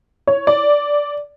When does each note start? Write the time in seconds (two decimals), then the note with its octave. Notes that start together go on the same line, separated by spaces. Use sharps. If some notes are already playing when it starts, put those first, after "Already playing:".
0.27 C#5
0.47 D5